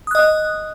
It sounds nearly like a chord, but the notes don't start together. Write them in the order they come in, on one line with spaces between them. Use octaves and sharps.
D#6 F#6 D#5